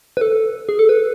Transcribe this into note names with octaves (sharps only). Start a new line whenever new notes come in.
B4
A4
G#4
A4
B4